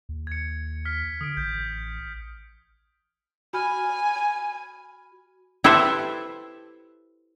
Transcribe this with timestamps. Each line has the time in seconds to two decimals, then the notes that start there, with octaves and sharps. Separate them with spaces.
0.09 D#2
0.27 G#6 C#7
0.85 F6 B6
1.21 D3 D#6 D7
1.37 A1 G6
3.53 F#4 G#5 B5 F6
5.64 E4 G4 A4 B4 C5 E5